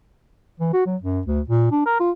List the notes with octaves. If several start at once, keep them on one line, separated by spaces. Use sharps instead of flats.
E3
F#4
F#3
F#2
D2
A#2
D4
A#4
F4